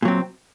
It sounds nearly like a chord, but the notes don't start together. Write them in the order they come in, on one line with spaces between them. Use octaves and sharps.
A#2 F#3 C4